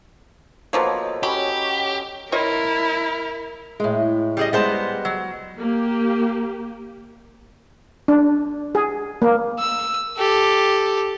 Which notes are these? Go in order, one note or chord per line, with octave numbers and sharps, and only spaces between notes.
B2 F3 A#3 B3 A4 C5 C#5 D#5
F#3 C#4 G4 B5
E4 F4 A#4 C#5 D#5
A2 G#3
G3 G#4 D#5
G3 G#3 B3 C5 A5
F#3
A#3 G4
D4
G#4
A#3
E6
G4 A4